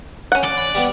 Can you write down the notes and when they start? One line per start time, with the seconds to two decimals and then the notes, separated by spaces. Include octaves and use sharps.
0.32 C#4 F#5
0.44 D5
0.57 B5
0.75 G3 B3